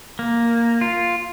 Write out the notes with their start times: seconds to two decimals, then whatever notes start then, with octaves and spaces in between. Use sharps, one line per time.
0.19 A#3
0.81 F4